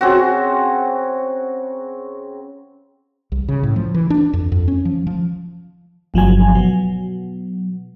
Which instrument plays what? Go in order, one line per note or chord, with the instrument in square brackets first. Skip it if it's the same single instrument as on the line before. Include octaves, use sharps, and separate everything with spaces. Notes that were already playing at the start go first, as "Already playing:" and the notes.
[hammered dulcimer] C#3 C4 F#4
[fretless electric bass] C2
C#3
A2
F3
E3
D4
F2
F2
C#4
F3
F3
[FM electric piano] G1 F3 F#3 G#5
B2 F#3